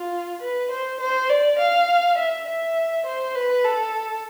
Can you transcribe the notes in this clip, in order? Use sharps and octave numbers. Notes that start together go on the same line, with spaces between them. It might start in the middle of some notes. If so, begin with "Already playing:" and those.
Already playing: F4
B4
C5
C5
D5
F5
E5
E5
C5
B4
A4